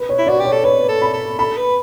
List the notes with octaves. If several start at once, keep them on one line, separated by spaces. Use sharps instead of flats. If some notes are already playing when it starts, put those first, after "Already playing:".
Already playing: B4
C#5
E4
F#4 D5
G4 C#5
A4
B4 C#5
A4
B5
A4
A4 B5
B4